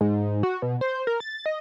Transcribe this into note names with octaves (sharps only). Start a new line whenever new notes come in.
G#2
F#4
B2
C5
A#4
A6
D#5